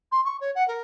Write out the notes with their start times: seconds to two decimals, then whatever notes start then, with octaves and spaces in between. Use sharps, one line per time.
0.11 C6
0.25 C#6
0.40 C#5
0.55 F#5
0.67 A#4